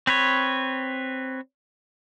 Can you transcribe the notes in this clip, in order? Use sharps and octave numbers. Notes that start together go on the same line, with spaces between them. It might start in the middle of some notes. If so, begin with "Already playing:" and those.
C4 B4 C#5